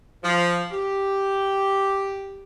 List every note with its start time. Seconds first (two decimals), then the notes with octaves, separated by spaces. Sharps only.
0.23 F3
0.71 G4